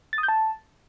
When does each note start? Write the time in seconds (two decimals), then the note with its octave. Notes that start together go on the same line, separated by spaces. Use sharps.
0.13 A6
0.18 D#6
0.23 G6
0.28 A5